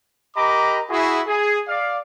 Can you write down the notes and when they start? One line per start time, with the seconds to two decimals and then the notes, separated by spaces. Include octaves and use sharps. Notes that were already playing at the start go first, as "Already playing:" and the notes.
0.37 G4 A#4 D#5 A#5 B5 D6
0.90 E4 F#4 G#4
1.27 G#4
1.68 D5 F5